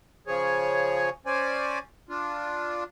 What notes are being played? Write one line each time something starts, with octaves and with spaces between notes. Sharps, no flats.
C#3 F3 G#4 C#5
C#4 C5 D5 G#5
D4 F4